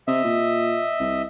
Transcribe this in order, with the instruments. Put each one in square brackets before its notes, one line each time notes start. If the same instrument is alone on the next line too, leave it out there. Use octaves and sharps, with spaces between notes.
[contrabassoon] C3 [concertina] D#5 E5
[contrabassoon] A#2
C2